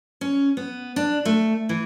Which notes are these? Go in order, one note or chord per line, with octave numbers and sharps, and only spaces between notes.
C#4
B3
D4
A3
E3